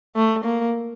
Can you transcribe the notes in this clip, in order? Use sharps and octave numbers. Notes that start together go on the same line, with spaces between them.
A3
A#3